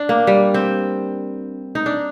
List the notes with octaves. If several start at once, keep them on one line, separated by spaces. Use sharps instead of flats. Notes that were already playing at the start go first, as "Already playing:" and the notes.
Already playing: D4
A#3
G3
C4
D#4
D4